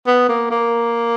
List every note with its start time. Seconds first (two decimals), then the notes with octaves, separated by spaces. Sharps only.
0.07 B3
0.29 A#3
0.51 A#3